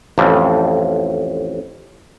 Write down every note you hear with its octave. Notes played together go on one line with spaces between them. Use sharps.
A1 F2